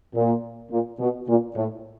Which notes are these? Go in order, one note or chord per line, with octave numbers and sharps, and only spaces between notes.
A#2
A#2
B2
A#2
A2